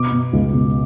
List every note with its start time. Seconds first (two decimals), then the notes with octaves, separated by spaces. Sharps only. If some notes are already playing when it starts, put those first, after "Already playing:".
Already playing: B2 D6
0.12 B2
0.33 C#2
0.53 B2